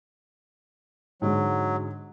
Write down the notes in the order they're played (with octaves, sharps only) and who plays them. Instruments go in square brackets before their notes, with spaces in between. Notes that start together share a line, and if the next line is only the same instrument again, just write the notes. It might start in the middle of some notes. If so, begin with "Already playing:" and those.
[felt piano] G#2 D3 G#3 [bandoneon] F#3